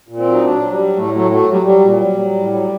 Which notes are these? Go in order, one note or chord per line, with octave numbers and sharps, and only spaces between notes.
A#2
C4
F#3
D#4
F#3 D4
F#3
G3
F#3
A2 A3
F#3 A3
F#3 A3
F#3 G3
F#3 G3
A#2
F#3
F#3
A2
F#3